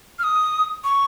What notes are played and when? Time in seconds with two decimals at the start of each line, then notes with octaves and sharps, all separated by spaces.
0.19 F6
0.23 D#6
0.84 C#6